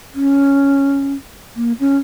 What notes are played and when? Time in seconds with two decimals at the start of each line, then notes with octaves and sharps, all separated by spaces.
0.14 C#4
1.56 A#3
1.80 C#4